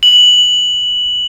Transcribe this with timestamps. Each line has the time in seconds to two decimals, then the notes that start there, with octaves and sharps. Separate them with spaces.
0.03 F#7